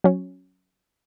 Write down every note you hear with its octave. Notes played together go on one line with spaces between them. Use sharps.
F#3 C#4